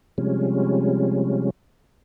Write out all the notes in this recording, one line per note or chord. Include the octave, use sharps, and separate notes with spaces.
C3 F3 G3 G#3 C#4